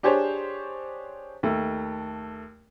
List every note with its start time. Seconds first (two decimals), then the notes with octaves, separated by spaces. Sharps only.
0.03 D4 G4 G#4 C5 C#5
1.43 D#2 A3